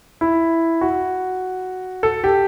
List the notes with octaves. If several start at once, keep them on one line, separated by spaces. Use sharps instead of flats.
E4
F#4
A4
G4